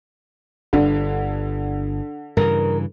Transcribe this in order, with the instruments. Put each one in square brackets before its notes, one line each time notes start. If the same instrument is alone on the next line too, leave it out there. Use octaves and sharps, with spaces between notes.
[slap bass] G1 [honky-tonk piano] D3
[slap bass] G2 C#3 E3 [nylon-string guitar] A#4